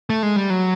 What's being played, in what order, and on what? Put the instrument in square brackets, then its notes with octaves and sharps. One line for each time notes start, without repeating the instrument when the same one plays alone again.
[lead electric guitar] A3
G#3
G3
F#3